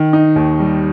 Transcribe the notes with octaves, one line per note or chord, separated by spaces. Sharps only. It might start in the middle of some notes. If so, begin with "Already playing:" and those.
Already playing: D#3
D#4
D#2
G3